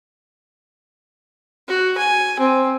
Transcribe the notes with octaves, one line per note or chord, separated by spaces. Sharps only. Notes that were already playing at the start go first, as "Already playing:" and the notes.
F#4
G#5
C4